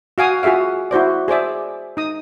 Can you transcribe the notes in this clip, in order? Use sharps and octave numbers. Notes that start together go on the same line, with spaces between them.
F#4 F5 G#5 D#6
F4 F#4 G#4 E5 F5
E4 F#4 C5 D5
G#4 C5 D5 E5
D#4 D#6